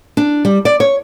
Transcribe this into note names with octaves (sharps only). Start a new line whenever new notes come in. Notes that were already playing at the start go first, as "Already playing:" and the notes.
D4
G3
D5
C#5